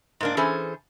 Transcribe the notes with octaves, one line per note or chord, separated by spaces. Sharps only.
G#2 A#3 D4
E3 C#4 G#4 A4 C5